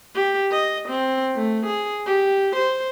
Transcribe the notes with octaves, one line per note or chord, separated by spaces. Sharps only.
G4
D#5
C4
A3
G#4
G4
C5